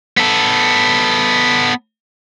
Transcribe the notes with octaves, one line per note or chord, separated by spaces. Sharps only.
B3 A4